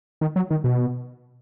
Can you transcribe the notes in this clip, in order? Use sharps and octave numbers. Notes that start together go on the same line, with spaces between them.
D#3
F#3
D#3
B2